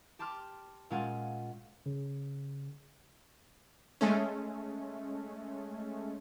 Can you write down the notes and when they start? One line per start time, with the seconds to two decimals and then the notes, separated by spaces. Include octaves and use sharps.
0.19 G4 A5 C6 D6 F6
0.90 A#2 G#3 C#4 F4 F#5 G#5
1.86 C#3
4.01 G#3 A3 C#4